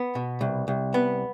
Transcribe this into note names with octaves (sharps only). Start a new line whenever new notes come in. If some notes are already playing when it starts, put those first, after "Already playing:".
Already playing: B3
B2
C2
C2
B3